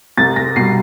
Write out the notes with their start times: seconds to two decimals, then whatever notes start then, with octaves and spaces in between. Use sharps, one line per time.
0.18 C2 A6
0.36 A#6
0.56 B2 G3 C7